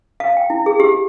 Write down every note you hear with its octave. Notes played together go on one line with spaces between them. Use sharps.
F5
G5
E4
G#4
G4